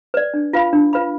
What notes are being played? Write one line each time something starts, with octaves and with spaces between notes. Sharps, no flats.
B4 D5
D4
F4 B4 F5 B5
D4
F4 B4 F5 B5